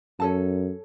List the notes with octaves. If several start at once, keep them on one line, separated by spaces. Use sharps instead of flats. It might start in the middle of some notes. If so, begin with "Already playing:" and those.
F#2 C#4 A4 A5